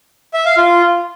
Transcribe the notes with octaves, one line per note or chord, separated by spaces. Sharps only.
E5
F5
F4